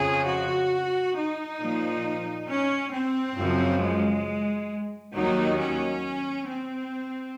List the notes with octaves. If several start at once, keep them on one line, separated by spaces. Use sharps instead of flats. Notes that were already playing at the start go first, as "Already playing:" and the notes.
Already playing: F2 C#3 F3 G#4
F#4
D#4
A#2 F3
C#4
C4
F#2 C#3 F3
G#3
D#2 D#3 F#3 D#4
C#4
C4